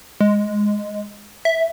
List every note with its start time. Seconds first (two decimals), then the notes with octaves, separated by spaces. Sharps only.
0.21 G#3
1.45 E5